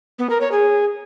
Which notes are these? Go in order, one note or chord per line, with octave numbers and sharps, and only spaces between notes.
B3
A#4
C#5
G#4